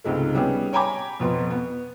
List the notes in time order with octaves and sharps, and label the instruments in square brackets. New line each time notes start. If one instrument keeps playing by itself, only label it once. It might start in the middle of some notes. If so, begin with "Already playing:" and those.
[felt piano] C#2 G#2 C3 G#3 A3
G3 B3 C#4 G4 G#4
C#5 G5 G#5 A#5 B5 D6
F2 B2 B4 C6
B3